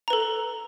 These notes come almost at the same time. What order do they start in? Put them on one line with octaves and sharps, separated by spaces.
A#5 B4 A4